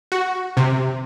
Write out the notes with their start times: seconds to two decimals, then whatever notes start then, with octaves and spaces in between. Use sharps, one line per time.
0.12 F#4
0.57 C3